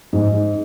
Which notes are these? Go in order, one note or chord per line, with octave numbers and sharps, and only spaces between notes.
G#2